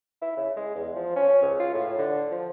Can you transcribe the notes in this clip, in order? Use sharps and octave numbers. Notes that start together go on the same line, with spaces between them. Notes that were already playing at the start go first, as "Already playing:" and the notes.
E4
C#3
G#3
E2
F3
C#4
C#2
F4
A2
D3
F3